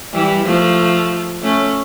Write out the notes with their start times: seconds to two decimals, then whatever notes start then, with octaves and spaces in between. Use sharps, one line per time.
0.13 E3 G3
0.45 F3 A3
1.43 A3 C#4